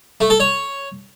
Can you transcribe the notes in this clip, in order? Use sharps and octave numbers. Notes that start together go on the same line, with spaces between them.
A3
A4
C#5